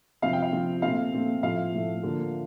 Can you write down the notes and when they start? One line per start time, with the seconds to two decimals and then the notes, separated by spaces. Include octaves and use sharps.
0.22 C3 F3 C4 F5
0.33 G5
0.42 F5
0.53 C3 F3 C4
0.82 A#2 A3 C4 F5
1.13 A#2 A3 C4
1.43 A2 F3 A3 F5
1.74 A2 F3 A3
2.03 D3 F3 A#3